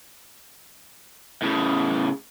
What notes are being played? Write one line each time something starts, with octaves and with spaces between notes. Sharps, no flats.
A2 C#3